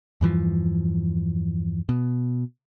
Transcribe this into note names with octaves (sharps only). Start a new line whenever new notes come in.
E2 G2 E3 F3
B2